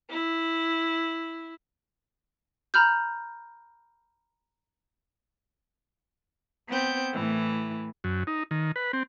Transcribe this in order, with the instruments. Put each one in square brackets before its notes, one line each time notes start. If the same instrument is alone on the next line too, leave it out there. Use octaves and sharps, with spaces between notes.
[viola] E4
[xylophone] A#5 B5 F6 G6
[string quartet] B3 C4 G6
A2 E3
[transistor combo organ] F#2
D#4
D#3
B4
C4